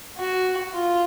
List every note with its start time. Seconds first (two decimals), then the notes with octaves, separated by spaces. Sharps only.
0.18 F#4
0.74 F4